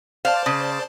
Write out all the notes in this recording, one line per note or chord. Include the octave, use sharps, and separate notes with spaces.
C5 D5 F5 A5
C#3